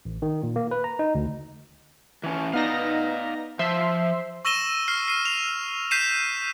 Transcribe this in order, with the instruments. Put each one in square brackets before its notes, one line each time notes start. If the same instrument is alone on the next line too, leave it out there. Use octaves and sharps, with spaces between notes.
[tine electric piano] A1
D#3
A#2
A#3
B4
A#5
D#4
D2
[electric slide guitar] E3 C#4
[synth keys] B3 D#4 A#6 [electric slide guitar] D5 F5
[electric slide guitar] F3 [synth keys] C5 E5 C6
[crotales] C#6 E6 A#6 D#7 E7 G7
F6 C7
C7 D#7
F7
G6 B6 C7 D#7 E7